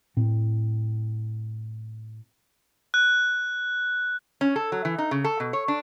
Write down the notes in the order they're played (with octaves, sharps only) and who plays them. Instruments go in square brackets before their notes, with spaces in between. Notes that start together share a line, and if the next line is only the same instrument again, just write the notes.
[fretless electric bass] A2 C4
[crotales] F#6
[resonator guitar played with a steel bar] C#4
A4
F#3
E3
D#4
C#3
A4
B2
C#5
D4